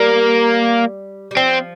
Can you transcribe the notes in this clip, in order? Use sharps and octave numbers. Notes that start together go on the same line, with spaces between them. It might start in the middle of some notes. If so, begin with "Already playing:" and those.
Already playing: G3 A#3
G3
F3 C4